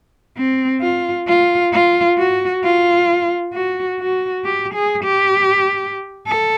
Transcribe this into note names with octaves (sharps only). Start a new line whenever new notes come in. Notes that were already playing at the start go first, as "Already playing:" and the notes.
C4
F4
F4
F4
F#4
F4
F#4
F#4
G4
G#4
G4
A4